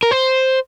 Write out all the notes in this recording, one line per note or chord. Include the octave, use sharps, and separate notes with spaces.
A#4
C5